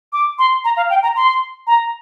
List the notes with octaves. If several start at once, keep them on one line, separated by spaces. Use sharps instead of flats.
D6
C6
A#5
F5
G5
A#5
C6
A#5